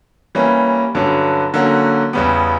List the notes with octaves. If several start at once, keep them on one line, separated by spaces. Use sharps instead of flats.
E3 G3 A#3 C#4
G2 D3 F#3 C#4
D3 F#3 A#3 C#4 F#4
E2 C#3 G3 B3